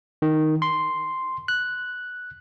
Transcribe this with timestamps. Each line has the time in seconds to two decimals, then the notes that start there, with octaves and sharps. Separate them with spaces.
0.22 D#3
0.62 C6
1.48 F#6